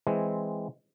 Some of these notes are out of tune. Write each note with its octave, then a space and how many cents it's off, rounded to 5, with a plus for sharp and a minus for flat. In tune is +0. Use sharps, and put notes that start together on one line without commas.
E3 +0 G#3 +0 C4 +0